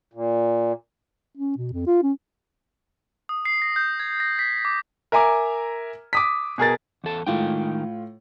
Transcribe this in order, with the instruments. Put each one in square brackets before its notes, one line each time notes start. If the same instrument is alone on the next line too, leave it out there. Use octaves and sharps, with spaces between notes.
[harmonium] A#2
[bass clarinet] C#4
B2
F2
F4
C#4
[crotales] D#6
C7
A#6
G6
G#6
A#6
B6
D6
[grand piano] A#4 E5 G#5 A#5 D6
D6 D#6 B6
B2 G#4 A#4 A6
[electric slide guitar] E2 A4
[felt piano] A2 F4 [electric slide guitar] D#3 G#3 G5